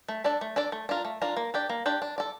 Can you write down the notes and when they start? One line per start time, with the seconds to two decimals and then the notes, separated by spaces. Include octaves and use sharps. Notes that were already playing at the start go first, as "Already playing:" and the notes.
0.08 A3
0.24 D4 A4 D5
0.41 A3
0.56 D4 A4 D5
0.72 A3
0.89 D4 F4 A#4
1.05 A3
1.22 D4 F4 A#4
1.37 A#3
1.54 D4 G4 D5
1.69 A#3
1.86 D4 G4 D5
2.02 D4
2.18 A4 D5